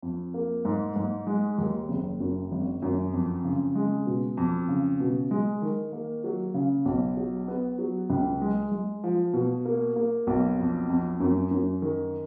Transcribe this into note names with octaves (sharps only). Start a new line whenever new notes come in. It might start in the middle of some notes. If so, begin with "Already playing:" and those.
F2
A#3
G#2
G#2
G#3
D#2
F#1
F#2
G#1
F#2
F2
C#3
G#3
B2
F2
C#3
B2
G#3
D#3
A#3
F#3
C#3
B1
F#3
B3
F#3
C#2
G#3
G#3
F3
B2
A#3
A#3
B1
F2
F2
F#2
F#2
D#3